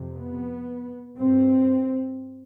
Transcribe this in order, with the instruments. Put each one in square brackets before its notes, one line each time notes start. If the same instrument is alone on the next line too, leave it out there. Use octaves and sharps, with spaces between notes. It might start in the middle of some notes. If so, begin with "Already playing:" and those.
Already playing: [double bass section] F2 C3
B3
G2 C4